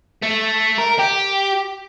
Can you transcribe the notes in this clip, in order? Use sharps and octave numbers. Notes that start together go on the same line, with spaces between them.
A3
A#4
G4